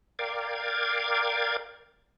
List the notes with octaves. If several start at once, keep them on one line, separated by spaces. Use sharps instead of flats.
A#4 D5 F5 G5 D6 G#6